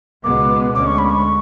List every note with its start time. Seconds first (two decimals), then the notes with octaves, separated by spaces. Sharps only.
0.24 C#2 B2 G#3 B3 D6
0.75 D2 D3 G#3 C#4 D6
0.87 C#6
0.98 B5
1.10 C#6